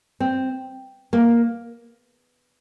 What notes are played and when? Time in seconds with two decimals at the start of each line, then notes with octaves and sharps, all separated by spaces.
0.20 C4
1.13 A#3